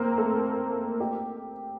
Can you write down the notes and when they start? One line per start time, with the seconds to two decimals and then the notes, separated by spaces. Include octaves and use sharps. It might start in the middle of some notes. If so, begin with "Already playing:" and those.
Already playing: A#3 C4 A#4 C5
0.18 A3 A4
1.00 G4